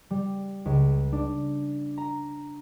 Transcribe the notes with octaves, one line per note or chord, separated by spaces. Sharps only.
G3
C#2
D4
A#5